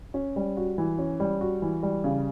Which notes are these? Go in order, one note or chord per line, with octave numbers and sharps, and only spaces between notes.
C#4
G3
F#4
E3
C#4
G3
F#4
E3
G3
C#3